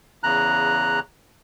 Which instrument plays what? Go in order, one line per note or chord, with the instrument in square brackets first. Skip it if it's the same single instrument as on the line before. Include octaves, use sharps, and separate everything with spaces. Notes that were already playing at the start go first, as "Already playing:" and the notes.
[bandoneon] E2 C#3 A#5 F#6